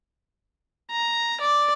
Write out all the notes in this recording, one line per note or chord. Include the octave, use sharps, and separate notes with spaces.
A#5
D5